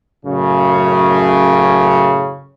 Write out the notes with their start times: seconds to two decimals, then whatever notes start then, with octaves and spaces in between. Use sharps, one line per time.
0.25 F#2 A2 C#3